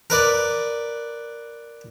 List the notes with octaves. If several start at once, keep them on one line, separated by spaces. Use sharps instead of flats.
A#4 B4 D5